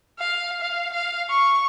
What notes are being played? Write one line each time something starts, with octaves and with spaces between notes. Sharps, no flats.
F5
F5
F5
C#6